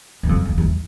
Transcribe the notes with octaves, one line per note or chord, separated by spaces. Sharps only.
F#2
F2
F2
E2